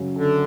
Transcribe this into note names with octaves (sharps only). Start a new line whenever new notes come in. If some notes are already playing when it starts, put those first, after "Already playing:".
Already playing: F#2 C#3 F#3
D3